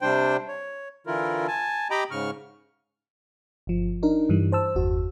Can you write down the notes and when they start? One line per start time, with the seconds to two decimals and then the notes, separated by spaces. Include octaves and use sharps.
0.02 C3 G3 D4 C5 G5
0.48 C#5
1.07 D3 E3 E4 F4 A#4
1.47 G#5 A5
1.91 G4 D#5 G5 A#5 B5 D6
2.11 G#2 C#3 C#6 F6
3.67 G1 F3
4.03 D4 D#4 A#4
4.29 G2 E3 G3
4.52 C5 A5 E6
4.76 G1 E2 F#4